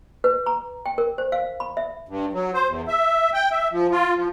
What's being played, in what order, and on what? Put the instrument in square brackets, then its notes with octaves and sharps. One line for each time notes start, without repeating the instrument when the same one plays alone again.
[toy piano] B4
A#5
G5
A#4
C5
F5
B5
E5
[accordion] G2
F#3
C5
E2
E5
G5
E5
F3
F4
F3